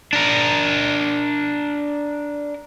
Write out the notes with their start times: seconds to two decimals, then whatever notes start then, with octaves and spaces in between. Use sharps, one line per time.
0.13 D4 A#4